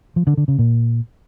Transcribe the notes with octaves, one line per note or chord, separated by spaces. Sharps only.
F3
D3
D3
C#3
A#2